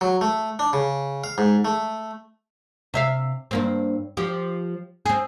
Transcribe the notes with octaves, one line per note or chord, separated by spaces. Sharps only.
F#3
A3
D4
C#3
F5
G#2
A3
C3 E5 F5
G2 A#3 C4
F3 G4
C4 G#4